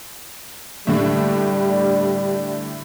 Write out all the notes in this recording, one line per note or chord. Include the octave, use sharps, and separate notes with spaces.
A2 D3 G3 A3